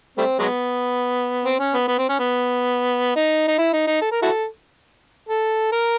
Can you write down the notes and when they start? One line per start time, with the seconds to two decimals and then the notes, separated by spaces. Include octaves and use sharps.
0.17 G3 A3 C4
0.39 F#3 G#3 B3
1.45 C4
1.59 C#4
1.74 B3
1.88 B3
1.98 C4
2.09 C#4
2.20 B3
3.16 D#4
3.48 D#4
3.59 E4
3.73 D#4
3.87 D#4
4.02 A4
4.12 A#4
4.22 E4 F#4 A4
5.29 A4
5.72 A#4